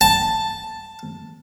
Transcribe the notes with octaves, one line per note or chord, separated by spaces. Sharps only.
A5